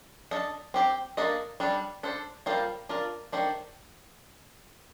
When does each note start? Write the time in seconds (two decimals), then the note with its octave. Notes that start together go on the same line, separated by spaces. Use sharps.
0.31 D4 A4 D#5
0.74 C4 G4 C5
1.17 A#3 D4 A4 D#5
1.60 G3 D4 A4
2.03 D4 A4 C5
2.46 G3 A#3 F4 A4 C5
2.89 D4 F4 A#4 D5
3.32 D#3 A3 D4 A4 C5